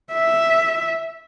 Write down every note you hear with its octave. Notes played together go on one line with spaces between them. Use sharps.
E5